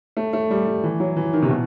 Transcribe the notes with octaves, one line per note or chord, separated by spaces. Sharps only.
A3
A3
G3
G3
E3
F#3
E3
D#3
C3
B2